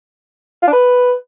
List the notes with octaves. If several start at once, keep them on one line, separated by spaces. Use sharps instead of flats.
F4
D4
B4